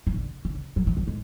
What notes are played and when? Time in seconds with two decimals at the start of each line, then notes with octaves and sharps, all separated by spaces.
0.07 E3
0.14 D3
0.45 D3
0.76 F#3
0.87 E3
0.97 F#3
1.08 G#3